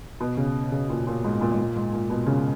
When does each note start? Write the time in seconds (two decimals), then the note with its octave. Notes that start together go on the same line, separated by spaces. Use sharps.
0.20 B2
0.37 C#3
0.72 C#3
0.90 A#2
1.07 A#2
1.24 G#2
1.41 A#2
1.52 G#2
1.58 A#2
1.76 G#2
1.93 A#2
2.10 B2
2.27 C#3